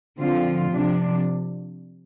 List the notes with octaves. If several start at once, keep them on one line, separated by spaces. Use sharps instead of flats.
D3 F3 C4 F4
C3 F3 D4